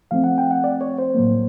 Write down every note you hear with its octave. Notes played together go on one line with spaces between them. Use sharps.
F3 A3 C4 F5
F#5
G5
F#5
D5
C#5
C5
A2 F#3 A#3